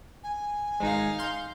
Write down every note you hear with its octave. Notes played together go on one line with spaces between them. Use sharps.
G#5
G#1 G#3 D#4 F5
C6 F6 G6